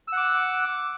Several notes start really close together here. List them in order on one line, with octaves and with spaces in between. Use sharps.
E6 F#5 D6